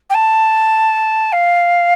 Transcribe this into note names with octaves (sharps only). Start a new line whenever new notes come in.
G5
A5
F5